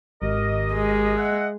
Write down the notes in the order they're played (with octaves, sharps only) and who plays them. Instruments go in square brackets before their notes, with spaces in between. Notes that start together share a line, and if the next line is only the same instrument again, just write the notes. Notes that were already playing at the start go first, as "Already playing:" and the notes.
[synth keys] G#1 [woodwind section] G4 A#4 D#5
[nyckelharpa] G#3
[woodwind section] D#5 E5 F#5